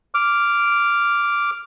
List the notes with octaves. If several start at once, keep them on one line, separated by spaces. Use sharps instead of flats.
D6 F6